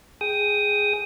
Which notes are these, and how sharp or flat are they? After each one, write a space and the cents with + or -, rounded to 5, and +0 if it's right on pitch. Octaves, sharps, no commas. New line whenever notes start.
G#4 +0 G5 +0 D#6 +5